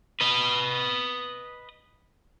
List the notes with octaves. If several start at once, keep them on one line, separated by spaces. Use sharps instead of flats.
B4 D#5